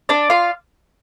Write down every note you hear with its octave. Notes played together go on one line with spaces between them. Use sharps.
D4 D5
F4 F5